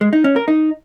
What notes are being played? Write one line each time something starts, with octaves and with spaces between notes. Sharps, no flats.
G#3
D#4
C#4
A#4
D#4